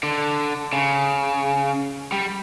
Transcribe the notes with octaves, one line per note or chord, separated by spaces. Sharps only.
D3
C#3
G3